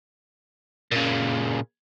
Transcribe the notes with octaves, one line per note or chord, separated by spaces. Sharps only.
A#2 C#3